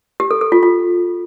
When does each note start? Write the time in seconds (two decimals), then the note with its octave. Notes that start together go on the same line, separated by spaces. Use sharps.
0.20 G4
0.31 A4
0.41 A4
0.52 F4
0.63 F4